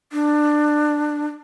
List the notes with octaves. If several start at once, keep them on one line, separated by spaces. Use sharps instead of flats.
D4